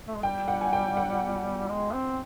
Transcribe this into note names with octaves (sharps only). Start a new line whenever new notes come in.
A3
G#3
G3 G5
F#5
G#5
G5
F#5
G#3
C4